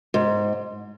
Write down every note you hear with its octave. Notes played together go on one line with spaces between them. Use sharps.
G#2